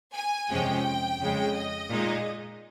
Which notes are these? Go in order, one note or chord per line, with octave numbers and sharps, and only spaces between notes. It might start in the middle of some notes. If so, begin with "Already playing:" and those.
G#5
F2 C3 F3 G#3 C#4 G5
F2 C#3 G#3
D#5
A#2 G#3 D#4